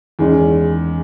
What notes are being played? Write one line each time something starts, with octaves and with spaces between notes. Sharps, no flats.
E2 D#3 G#3 C#4